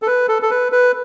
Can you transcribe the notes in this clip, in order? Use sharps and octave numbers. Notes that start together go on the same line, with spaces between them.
A4
B4
A4
A4
B4
B4